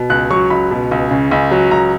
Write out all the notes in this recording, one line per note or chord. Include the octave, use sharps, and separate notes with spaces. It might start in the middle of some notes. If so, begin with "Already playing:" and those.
Already playing: B2
C#2 F#6
F#3 C#6
C#2 B5
B2
C#2
C#3
C#2
F#3
C#2 A#5